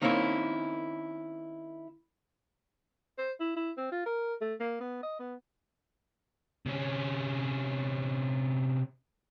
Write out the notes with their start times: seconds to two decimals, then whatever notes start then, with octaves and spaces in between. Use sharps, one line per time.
0.02 D#3 A#3 C4 C#4 E4
3.19 C5
3.40 E4
3.57 E4
3.78 C4
3.92 F4
4.06 A#4
4.41 A3
4.60 A#3
4.80 B3
5.03 D#5
5.20 B3
6.66 C3 C#4